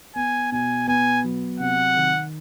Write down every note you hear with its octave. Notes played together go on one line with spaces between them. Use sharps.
B3 G#5
B2 G#5
B3 G#5
F#3
C3 F#5
D#3